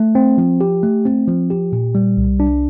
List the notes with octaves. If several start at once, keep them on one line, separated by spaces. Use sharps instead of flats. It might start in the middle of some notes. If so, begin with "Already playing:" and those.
Already playing: A3
C4
F3
G4
A3
C4
F3
G4
A#2
G3
C2
D4